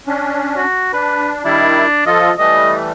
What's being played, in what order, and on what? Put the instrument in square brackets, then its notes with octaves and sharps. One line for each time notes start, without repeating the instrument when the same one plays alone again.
[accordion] C#4 D4
[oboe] F#4
[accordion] D4 [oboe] B4
[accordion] D#3 G3 E4 [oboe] D4
[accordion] F3 F4 A4 [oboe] D#5
[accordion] E3 G3 A3 [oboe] D#5